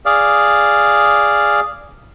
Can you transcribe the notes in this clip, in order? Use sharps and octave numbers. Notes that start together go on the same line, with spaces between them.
G#4 D5 F5